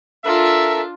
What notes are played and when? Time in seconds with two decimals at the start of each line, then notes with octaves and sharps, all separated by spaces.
0.25 D4 F4 A4 A#4 E5